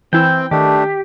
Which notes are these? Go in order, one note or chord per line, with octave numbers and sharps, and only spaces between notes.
E3 C4 E4 G5
D#3 A3 D4 G4